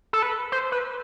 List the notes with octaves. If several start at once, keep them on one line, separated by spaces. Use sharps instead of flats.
A4
B4
C5
B4